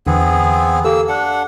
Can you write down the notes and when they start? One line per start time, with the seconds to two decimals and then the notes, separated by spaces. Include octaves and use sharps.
0.07 E2 D3 E3 B3 C4 G#4
0.84 A#3 G4 A4 E6
1.09 D4 F#5